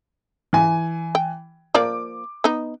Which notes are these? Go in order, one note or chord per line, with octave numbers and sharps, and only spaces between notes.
E3 G#5
G5
F3 A#3 D5 D6
B3 D#4